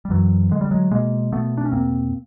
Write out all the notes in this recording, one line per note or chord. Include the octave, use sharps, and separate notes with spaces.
G3
F#2 E3 F#3
D3 G#3
G3
F#3 G#3
B2 G#3 A#3
B2 A3 B3
D4
C#4
E2 A#3 C4